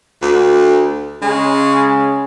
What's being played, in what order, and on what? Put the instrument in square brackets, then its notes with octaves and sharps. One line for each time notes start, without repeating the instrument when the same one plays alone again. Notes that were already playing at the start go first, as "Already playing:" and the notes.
[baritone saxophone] D2
[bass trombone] C#3 [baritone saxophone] G#3